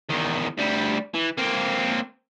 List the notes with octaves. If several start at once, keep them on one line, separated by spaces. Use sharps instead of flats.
E2 D#3
D2 G3
E3
A#3 C4